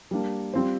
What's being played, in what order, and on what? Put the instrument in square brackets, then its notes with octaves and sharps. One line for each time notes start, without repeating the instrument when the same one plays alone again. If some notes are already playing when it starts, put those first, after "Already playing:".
[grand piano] G3 A#3 D4
G3 C4 F4 C5